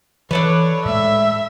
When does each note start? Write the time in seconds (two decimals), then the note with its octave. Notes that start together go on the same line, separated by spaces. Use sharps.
0.31 E3 D4 A4 B4 C#5
0.85 A2 G#3 E5